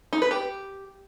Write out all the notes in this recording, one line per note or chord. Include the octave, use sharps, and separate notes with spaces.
D#4
B4
G4